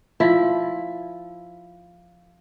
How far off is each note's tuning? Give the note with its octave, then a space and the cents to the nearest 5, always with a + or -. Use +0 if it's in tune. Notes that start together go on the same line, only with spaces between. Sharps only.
F3 +0 E4 +5